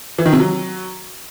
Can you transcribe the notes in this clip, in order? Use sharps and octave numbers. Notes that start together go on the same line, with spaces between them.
E3
D#3
C3
F#3